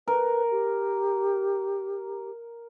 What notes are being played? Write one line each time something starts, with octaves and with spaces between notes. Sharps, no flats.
A#4 B4
G4